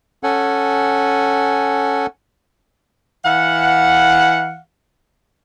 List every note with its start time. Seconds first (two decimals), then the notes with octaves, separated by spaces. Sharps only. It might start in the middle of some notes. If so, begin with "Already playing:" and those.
0.23 C#4 A4 F#5 G#5
3.24 E3 F5 F#5